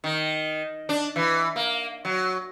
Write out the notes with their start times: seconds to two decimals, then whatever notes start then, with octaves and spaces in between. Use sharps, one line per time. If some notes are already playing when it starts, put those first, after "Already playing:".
0.04 D#3
0.89 D4
1.16 E3
1.56 A#3
2.05 F#3